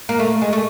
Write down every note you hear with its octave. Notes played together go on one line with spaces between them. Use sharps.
A#3
A3
G#3
A3